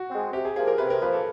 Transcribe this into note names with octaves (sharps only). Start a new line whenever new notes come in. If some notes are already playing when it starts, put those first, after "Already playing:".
Already playing: F#4
G#3 C4
C3 G4
G#4
F3 A#3 G#4
A#4
C3 B4
A#4
F3 A#3 B4
A4